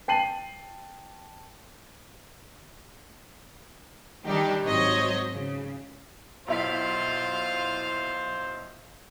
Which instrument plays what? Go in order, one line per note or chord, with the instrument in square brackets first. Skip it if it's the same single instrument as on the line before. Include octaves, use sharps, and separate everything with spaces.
[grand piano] G5 A5 C7 D#7 F#7
[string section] D#3 G3 D4 D#4 G4
G#1 F#3 C5 C#5 D#5
C#3
[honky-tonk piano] B1 E4 B6 [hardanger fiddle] F4 F5 [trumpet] C5